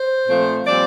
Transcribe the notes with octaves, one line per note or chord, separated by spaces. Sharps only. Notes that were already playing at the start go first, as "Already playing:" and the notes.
Already playing: C5
A#2 F3 A3 C4
A#2 G3 C4 D5